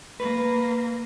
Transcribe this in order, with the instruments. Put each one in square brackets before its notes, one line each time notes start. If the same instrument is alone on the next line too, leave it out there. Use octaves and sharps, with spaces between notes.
[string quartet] A#3 [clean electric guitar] B4